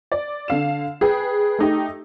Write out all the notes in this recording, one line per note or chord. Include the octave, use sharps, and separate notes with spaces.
D5
D3 F5 E7
G#4 B4 G5
A3 D#4 G4